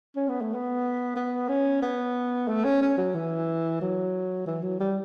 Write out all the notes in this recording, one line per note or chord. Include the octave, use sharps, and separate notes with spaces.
C#4
B3
A3
B3
B3
C#4
B3
A3
C#4
C#4
F#3
E3
F#3
E3
F#3
G3